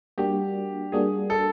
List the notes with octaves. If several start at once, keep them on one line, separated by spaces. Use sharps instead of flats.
G3 A#3 D4 F#4 G4
G3 A#3 D4 F#4 G#4
A4